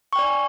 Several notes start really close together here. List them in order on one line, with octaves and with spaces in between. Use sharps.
C#6 G5 D5 G#5